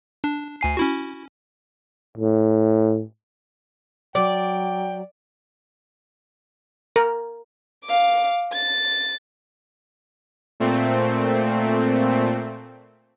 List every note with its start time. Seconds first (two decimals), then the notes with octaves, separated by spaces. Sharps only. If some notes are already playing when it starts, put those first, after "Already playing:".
0.24 D4
0.61 D2 G#5 C7
0.77 C#4 E4 F#4
2.18 A2
4.15 F#3 D5 G5
6.96 A#4
7.85 F5 D6
8.53 A6
10.60 A#2 A3 C4